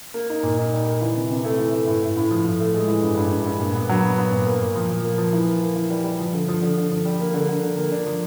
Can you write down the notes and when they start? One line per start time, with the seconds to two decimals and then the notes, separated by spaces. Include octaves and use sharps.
0.14 A#3
0.30 D#4
0.43 A#2
0.58 D#4
0.73 G3
0.87 A#3
1.01 E3
1.16 C3
1.30 C3
1.45 A3
1.59 E3
1.73 A3
1.87 A2
2.02 A2
2.17 A2
2.31 F3
2.46 A2
2.60 A3
2.74 G#3
2.88 E3
3.02 G2
3.17 G2
3.31 G2
3.46 G2
3.60 A#2
3.74 B3
3.89 F#3
4.03 B3
4.18 B3
4.32 A#2
4.46 A#3
4.62 A#2
4.76 F3
4.90 F3
5.04 A#3
5.18 F3
5.33 E3
5.47 A#3
5.62 A#3
5.76 E3
5.90 G3
6.04 G3
6.20 F3
6.33 D3
6.48 F3
6.62 D3
6.77 D3
6.91 F3
7.05 G3
7.20 A#3
7.34 D3
7.48 D3
7.63 D3
7.77 A#3
7.92 D4
8.06 F3